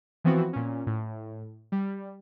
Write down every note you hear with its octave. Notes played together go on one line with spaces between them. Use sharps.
E3 F3 B3 C4 F#4
A#2 C#4
A2
G3